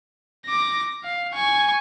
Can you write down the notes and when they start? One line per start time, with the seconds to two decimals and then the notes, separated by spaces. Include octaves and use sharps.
0.46 D6 A#6
1.03 F5
1.34 G#5 C#6